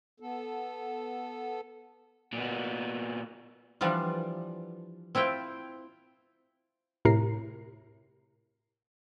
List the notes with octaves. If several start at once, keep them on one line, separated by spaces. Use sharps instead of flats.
B3 A4
A#2 B3
E3 F3 G3 B3 D4 F4
C4 E4 F4 G5
A2 C3 A#4 A#5 C7